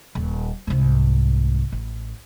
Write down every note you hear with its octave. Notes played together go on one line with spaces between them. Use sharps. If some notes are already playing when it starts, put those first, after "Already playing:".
D#1
C2 G#2
A1